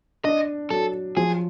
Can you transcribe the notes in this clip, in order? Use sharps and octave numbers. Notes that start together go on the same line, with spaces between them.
D4 D#5
F#3 A4
F3 G#4